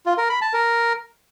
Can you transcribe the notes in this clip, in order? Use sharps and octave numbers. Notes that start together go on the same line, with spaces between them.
F4
A#4
B5
A5
A#4